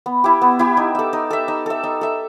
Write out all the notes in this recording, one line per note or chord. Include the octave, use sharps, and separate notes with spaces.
B3
E4 G4
B3
E4 G4
D#4
A4 E5
D#4
A4 E5
D#4
A4 E5
D#4
A4 E5